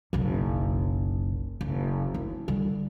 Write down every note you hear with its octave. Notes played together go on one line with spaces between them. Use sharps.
F#1 B1
F#1
E4
D3 G3